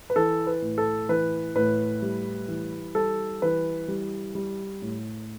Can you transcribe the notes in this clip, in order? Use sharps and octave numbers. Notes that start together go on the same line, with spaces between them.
B4
E3 A4
B4
A2
A4
E3 B4
A2 B4
G3
E3
G3 A4
E3 B4
G3
G3
A2